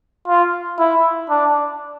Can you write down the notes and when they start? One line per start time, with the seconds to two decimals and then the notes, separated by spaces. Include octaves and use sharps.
0.28 F4
0.79 E4
1.29 D4